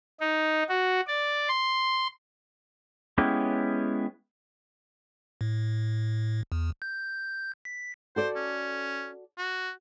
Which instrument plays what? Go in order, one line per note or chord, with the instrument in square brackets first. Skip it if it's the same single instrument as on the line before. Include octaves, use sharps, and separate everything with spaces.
[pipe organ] D#4
F#4
D5
C6
[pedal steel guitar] G#3 B3 C#4 E4 G4
[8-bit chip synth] A2
E2
G6
B6
[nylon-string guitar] F#4 A4 D5 [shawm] C5
[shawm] C#4
F#4